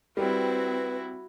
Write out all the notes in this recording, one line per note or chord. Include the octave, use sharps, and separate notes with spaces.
G3 C4 E4 F#4 B4